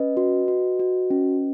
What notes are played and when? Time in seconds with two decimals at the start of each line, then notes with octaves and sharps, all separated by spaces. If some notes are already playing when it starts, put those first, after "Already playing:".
Already playing: C#4 B4 D#5
0.17 F#4
0.48 F#4
0.79 F#4
1.11 C#4